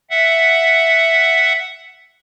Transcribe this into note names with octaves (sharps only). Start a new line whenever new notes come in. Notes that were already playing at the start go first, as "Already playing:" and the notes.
E5 F#5